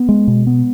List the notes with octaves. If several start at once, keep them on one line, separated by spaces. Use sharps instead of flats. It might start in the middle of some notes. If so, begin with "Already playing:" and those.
Already playing: B3
G#3
B2
B3